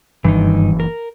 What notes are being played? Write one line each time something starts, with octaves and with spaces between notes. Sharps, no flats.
F#1 B1 G2 D#3 E3 D#4
A#4